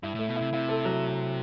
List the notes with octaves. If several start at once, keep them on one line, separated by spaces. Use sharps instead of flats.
G2 E4
A2 A3
B2
C3 E4
C3 E4
A4
F#3